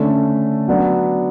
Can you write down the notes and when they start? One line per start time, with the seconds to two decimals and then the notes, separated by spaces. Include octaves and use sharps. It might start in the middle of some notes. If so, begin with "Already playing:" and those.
Already playing: D3 A3 C#4
0.68 F#3 B3 D4